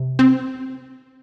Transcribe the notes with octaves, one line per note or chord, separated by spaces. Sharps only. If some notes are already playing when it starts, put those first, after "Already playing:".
Already playing: C3
C4